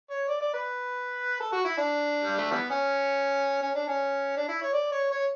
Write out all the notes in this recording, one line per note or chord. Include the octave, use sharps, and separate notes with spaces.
C#5
D5
D5
B4
A4
F#4
E4
D4
G3
A3
E3 G3 B3
C#4
C#4
D4
C#4
D4
E4
C#5
D5
C#5
C#5